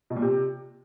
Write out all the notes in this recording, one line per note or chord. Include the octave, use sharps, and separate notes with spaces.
B2
A#2
C3